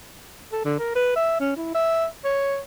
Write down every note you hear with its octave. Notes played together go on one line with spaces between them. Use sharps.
A4
D3
A#4
B4
E5
C#4
E4
E5
C#5